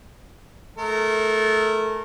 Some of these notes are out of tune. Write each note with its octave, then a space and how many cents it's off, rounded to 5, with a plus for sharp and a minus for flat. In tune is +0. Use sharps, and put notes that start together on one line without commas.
A3 -20 A#4 -25